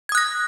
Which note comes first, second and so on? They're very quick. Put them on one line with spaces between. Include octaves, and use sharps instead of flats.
G#6 D#6 F#6 A#6